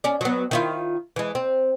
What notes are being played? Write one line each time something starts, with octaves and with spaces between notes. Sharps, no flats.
C#4 D4
F#3 B3
D#3 E4 F4
E3 G#3
C4